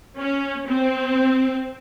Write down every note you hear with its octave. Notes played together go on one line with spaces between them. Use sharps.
C#4
C4